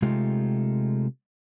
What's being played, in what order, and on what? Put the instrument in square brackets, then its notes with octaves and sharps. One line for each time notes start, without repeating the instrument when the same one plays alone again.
[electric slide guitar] C3 G#3 A3 D#4 F4 G4